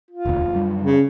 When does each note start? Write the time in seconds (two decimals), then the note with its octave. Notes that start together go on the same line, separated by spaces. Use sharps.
0.11 F4
0.26 E1 D2
0.53 F#2 G3
0.83 C#3